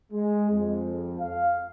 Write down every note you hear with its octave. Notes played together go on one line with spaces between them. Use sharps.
G#3
F2
F5